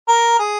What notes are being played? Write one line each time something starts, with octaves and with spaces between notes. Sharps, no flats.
A#4
G#4